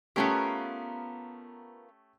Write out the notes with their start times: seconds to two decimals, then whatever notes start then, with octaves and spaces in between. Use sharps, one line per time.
0.16 A3 B3 C#4 F4 G4 A#4